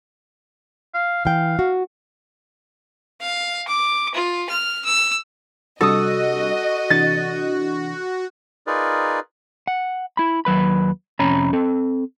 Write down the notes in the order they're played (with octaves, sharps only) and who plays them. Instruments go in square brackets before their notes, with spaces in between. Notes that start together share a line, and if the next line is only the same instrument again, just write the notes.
[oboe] F5
[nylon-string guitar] E3 G5 [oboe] F5
[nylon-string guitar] F#4
[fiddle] F5
D6
F4
F6
E6
[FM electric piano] C3 G3 D4 [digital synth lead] F#4 [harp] A4 D#6 [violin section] D#5
[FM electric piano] C3 E3 D4 [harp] A6
[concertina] D#4 F4 G#4 A#4 B4 D5
[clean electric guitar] F#5
E4 B5
D#2 F#3 B4 B5
F2 C3 C#4 C#5 A#5 B5
C4 A4